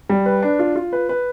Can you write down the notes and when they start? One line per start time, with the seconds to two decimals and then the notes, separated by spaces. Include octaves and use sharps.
0.10 G3
0.26 B4
0.43 D4
0.59 F4
0.76 F4
0.93 B4
1.09 B4